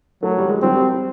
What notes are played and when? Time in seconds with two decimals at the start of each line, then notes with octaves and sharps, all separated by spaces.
0.23 F#3 A3
0.38 G3
0.49 G#3
0.62 F#3 C4
0.75 G3